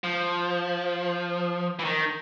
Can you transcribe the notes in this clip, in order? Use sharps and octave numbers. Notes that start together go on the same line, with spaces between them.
F3
E3
D#3